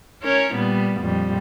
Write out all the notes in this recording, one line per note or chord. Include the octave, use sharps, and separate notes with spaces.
C#4 A#4 C#5
A#2 G3 B3
F2 A#2 G3